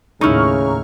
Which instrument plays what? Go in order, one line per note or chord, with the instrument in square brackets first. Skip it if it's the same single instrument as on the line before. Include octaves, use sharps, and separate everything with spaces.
[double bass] D#2 A2 [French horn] C#3 [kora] D#4 E4 [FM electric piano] A#5 C#6 F6